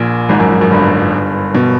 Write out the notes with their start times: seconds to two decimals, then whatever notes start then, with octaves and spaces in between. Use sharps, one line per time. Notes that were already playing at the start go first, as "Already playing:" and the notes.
Already playing: A#1 A#2
0.29 G#1 G#2
0.40 F#2
0.50 F#2
0.61 F#2
0.71 G1 G2
1.55 B2